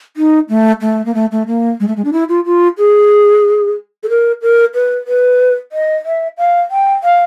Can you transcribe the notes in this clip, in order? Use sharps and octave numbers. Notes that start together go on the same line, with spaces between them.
D#4
A3
A3
A#3
A3
A3
A#3
G#3
A3
G#3
D4
E4
F4
F4
G#4
A4
A#4
A#4
B4
B4
D#5
E5
F5
G5
F5